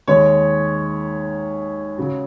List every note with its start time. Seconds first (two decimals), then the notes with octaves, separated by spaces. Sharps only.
0.08 D#2 D#3 G#3 C#5
1.98 C#3 F#3